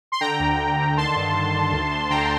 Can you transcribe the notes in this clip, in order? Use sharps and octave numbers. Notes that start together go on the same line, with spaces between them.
C6
D3 G5 A#5
D2
D2
D3
D#3 A5 C6
G2
D#3
D#3
D2
D2
D3 G5 A#5